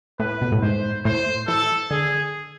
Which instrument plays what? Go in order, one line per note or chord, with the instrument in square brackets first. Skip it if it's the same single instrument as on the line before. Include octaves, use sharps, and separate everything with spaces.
[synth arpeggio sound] A2 [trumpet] B4
[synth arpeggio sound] B2
A2
[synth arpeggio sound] G#2 [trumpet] C5
[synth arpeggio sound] A2 [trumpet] C5
[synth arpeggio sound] E3 [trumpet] A4
[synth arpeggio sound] D3 [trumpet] G#4